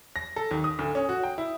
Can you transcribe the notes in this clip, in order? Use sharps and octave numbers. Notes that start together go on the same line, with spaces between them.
A#6
A4
D#2
D#6
D2
C#4
F#4
G5
E4